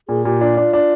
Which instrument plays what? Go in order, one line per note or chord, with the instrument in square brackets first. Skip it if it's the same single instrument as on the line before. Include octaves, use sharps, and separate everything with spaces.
[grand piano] A#2 [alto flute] G#4
[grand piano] A#2 [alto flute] G4
[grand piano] D4 [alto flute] F4
[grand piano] D4
D4